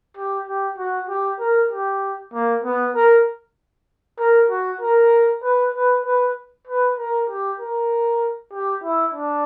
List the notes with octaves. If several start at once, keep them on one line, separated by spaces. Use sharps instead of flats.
G4
G4
F#4
G4
A#4
G4
A#3
B3
A#4
A#4
F#4
A#4
B4
B4
B4
B4
A#4
G4
A#4
G4
E4
D4